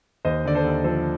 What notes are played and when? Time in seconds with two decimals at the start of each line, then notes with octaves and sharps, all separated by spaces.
0.25 D#2 C5 D#5
0.45 D3 D5
0.54 A4 C5
0.65 D#2
0.84 F3 A4 C5